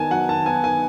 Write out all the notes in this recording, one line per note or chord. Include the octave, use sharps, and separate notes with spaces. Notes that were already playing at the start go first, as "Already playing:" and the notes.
Already playing: D#3 B3 G#5 A5
F#3 F#5
D#3 A5
B3 G#5
D#3 G#5